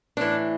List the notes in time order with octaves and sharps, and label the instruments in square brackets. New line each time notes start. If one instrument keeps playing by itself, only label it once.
[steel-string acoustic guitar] A2 E3 D4